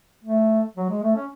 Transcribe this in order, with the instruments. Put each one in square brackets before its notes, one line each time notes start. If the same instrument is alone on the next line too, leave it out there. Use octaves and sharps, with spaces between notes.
[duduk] A3
F#3
G#3
A3
C#4